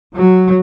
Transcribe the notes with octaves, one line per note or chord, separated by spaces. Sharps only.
F#3